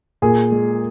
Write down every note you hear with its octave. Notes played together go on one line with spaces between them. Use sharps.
A#2 G#4
G#3